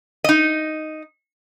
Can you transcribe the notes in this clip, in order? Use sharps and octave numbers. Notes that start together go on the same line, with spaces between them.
D#4 D#5